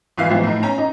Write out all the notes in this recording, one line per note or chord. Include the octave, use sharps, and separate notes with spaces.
G#1 E3 F5 C7
G#2 E3 F3
A2 D#4
C#4 A#5
D#4